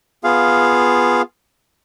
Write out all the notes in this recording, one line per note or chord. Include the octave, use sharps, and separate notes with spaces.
B3 F4 G#4 F5